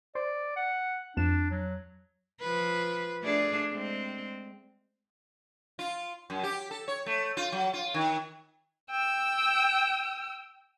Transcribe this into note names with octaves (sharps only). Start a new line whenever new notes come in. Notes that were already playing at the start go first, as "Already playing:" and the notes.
C5 D5
F#5
F2 D4 E7
F#3
F3 B4
A3 D4 G#4
G#3 C4
F4
F#2
G4
A4
C#5
A3
F4
F#3
F4
D#3
G5 E6